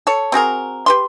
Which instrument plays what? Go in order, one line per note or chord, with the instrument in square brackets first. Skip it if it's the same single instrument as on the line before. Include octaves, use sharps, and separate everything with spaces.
[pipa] A4 C#5
C4 F#4 G#4 A#4
G4 B4 C6